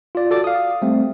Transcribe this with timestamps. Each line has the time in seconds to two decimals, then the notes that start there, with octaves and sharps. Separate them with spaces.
0.15 F4 D5
0.30 F#4 A4 D5 D6
0.44 F5 D#6
0.82 G3 A3 C4